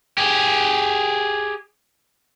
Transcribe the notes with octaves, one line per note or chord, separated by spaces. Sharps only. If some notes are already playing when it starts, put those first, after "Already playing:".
G4 G#4